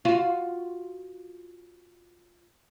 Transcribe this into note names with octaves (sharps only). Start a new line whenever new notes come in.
F4 F#4